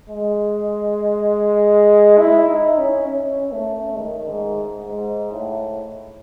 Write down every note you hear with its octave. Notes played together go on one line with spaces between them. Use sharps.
G#3
E4
D#4
C#4
C#4
A3
D#3
G#2
G#2
A2